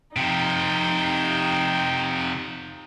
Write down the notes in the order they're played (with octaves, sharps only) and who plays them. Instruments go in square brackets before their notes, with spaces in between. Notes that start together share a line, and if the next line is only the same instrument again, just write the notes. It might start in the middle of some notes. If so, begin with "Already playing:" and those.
[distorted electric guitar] C3 F3 [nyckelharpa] D#4 G5